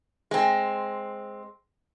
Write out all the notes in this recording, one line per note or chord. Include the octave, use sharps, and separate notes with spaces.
G#3 C4